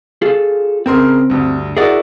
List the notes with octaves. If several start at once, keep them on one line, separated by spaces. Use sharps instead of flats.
F4 G#4 A4
C#3 C4 A#4 C6
D2 G2
E4 F#4 G#4 A#4 D5